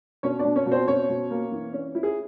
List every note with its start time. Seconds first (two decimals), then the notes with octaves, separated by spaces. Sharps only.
0.23 B2 C#4 C#5
0.39 D4 D5
0.45 B2
0.56 C#4 C#5
0.66 B2
0.72 C4 C5
0.88 B2 C#4 C#5
1.09 B2
1.30 A#3
1.52 E3
1.73 C#4
1.95 E4
2.03 G#4